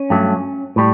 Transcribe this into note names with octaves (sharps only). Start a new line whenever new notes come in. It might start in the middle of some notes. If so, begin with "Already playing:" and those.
Already playing: C#4
G2 F#3 A3
A2 G3